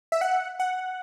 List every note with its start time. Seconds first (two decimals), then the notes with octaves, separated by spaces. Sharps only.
0.12 E5
0.21 F#5
0.60 F#5